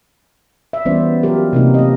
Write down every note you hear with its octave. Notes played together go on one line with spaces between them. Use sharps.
E5
E3 G3 B3 C#4 C5 D5
F#3 F4 G4 A#4
C3 A#3 D#4
A3 D#5